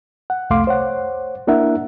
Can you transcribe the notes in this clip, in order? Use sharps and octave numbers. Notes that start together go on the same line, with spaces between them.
F#5
C2 F2 A3 F5 C6 D6
C5 C#5 F#5
A#3 D4 E4 A#4 E5 F#5